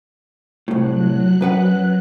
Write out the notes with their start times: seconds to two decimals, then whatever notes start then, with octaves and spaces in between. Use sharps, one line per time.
0.68 C2 A2 F#3 F#6
1.41 F#2 B4 F#5